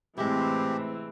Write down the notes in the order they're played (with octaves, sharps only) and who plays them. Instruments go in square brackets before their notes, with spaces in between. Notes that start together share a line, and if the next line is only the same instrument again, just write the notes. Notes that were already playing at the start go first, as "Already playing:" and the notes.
[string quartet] A2 C3 [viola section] E3 C4 [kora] G#3 E4 [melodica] G4